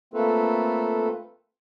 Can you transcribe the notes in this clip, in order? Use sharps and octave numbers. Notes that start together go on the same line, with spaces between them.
A3 A#3 C4 F4 A4 B4